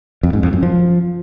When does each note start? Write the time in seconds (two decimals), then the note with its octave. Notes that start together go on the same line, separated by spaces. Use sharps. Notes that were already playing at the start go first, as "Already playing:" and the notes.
0.23 F2
0.33 G#2
0.43 F2
0.53 F#2
0.63 F3